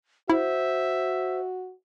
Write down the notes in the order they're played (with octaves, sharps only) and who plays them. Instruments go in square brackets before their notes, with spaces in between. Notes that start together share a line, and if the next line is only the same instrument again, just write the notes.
[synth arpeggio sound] E4 [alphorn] F#4 [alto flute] C5 [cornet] E5